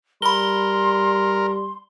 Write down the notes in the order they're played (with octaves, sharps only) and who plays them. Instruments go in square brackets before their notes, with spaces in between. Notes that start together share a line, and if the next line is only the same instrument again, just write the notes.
[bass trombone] G3 [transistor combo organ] A#4 [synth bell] B5 G7 [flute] C6